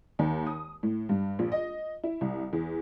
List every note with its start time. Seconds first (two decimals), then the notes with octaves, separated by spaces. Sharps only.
0.19 D#2
0.46 D#6
0.83 A2
1.09 G2
1.39 A#1
1.52 D#5
2.04 E4
2.21 C2
2.53 E2